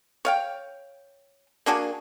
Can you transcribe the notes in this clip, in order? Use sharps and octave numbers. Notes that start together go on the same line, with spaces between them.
C#5 F5 G5
A#3 D4 F#4 G#4